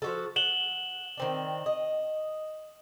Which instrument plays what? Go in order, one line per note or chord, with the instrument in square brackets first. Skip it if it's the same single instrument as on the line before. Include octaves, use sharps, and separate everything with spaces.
[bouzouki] F3 F#4 A4
[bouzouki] F#5 [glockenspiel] E7 F#7 G7
[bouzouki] D#3 C4 D4
D#5